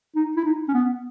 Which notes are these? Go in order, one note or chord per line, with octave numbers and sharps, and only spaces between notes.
D#4
E4
D#4
C#4
B3